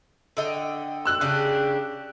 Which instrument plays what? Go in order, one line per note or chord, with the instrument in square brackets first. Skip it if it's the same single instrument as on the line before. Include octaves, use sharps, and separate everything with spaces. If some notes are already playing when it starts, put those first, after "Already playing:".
[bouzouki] D3 D#5 G5
[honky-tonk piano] E6 F#6
[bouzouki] C#3 D4 G4